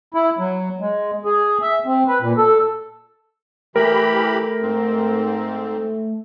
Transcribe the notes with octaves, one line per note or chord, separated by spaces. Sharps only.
E4
F#3
G#3
G#4
E5
C4
B4
A#2
A4
E3 A3 G4 A#4 B5
G#2 C4